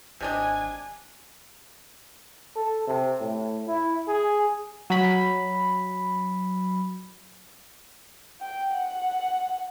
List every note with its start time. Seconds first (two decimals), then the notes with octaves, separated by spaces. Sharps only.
0.21 G#1 C3 D4 D#5 G#5
2.56 A4
2.87 C3
3.20 A2
3.68 E4
4.08 G#4
4.90 F#3 B5
8.41 G5
8.74 F#5